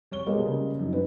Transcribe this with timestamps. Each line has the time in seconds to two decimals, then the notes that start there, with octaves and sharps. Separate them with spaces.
0.11 G3 C#5 G7
0.26 B2 G3 G#3 A#3 B3
0.45 C#3
0.79 F#2 D#4 E4
0.93 G2 B4